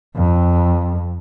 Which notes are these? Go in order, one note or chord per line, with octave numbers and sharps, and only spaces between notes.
F2